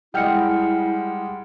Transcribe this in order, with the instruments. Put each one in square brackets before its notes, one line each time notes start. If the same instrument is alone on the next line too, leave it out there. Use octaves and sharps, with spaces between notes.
[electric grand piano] G3 G#3 [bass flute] E4 [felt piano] D#5 G5 F6 [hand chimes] F#5 C#7